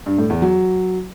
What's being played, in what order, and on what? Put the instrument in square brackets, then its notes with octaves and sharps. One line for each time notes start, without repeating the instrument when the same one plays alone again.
[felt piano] G2
A2
E2
F#3